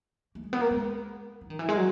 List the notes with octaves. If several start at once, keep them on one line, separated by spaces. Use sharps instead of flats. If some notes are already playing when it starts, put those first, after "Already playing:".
A#3
G#3
B3
A#3
G#3
E3
D#3
E3
G#3
F#3